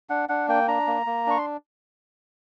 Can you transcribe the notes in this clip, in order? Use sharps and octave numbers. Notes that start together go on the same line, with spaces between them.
D4 F#5
D4 F#5
A#3 G5
D4 A#5
A#3
A#3
D4 C#6
C6